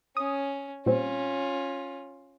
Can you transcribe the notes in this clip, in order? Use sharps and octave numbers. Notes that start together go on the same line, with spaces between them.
C#4 D#6
A#2 G3 C4 C#4 F4